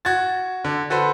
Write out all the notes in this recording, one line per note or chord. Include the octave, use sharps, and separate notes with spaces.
F#4 G#6 A6
D3
F#4 A4 B4 C5